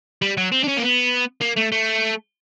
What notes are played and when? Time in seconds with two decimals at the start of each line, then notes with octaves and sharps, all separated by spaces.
0.22 G3
0.37 F#3
0.52 C4
0.63 D4
0.67 C#4
0.77 A#3
0.82 B3
1.41 A#3
1.56 A3
1.72 A3